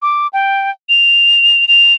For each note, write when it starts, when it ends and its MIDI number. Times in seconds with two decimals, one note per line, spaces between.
0.02 0.27 86
0.33 0.70 79
0.89 1.65 101
1.68 1.93 101